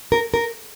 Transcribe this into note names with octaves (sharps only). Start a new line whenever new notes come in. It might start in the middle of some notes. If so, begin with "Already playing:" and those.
A#4
A#4